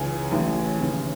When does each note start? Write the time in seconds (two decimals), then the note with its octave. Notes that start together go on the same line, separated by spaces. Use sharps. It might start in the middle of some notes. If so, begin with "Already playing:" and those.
Already playing: C#2 C#3 E3 G#5
0.31 A1 A2 E3
0.78 D#2 C#3 E3